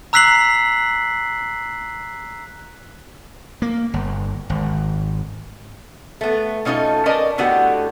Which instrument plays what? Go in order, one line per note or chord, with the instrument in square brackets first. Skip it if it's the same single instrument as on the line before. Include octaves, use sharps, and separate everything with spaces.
[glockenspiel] A#5 E6 F#6 B6 C7 F#7
[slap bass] A#3
G1
G#1
[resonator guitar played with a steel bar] A3 B3
B2 C#4 D#4 F4 A4
C#4 A#4 B4 D5 D#5 A5
A2 D3 B3 F#4 G4 F#5